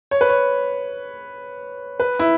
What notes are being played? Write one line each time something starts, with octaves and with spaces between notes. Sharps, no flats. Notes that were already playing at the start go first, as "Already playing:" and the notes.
C#5
B4
C#5
B4
E4